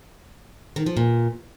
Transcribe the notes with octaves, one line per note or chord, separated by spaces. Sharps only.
D#3
F3
A#2